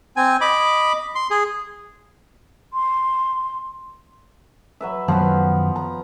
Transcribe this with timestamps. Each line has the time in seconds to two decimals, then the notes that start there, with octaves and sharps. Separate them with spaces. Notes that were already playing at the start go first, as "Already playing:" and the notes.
0.17 C4 G#5
0.41 D#5 B5 D6
1.15 C6
1.31 G#4
2.73 C6
4.81 F#3 B4 E5
5.08 F#2 D#3 F3 F#3 B3
5.76 A#5